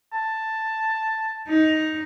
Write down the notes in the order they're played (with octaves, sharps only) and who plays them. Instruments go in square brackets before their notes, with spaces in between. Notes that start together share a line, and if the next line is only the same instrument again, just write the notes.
[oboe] A5
[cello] D#4